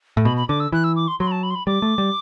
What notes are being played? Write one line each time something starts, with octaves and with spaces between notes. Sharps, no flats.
A2
B2 B5
B5
D3 D6
E6
E3 F#6
E6
D6
C6
F#3 C6
B5
A5
B5
C6
B5
G3 D6
A3
G3